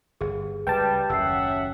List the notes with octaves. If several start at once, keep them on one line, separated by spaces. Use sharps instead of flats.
G1 G#4
C#2 G3 B4 G5 A5
F#1 D#2 C#4 E5 F#5 E6 C7